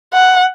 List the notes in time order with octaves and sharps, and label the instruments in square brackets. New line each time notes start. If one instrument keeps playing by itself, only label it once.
[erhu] F#5